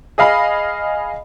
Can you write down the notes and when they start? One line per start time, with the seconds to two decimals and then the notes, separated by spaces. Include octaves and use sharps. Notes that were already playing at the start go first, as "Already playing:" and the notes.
0.18 G#4 D#5 F5 B5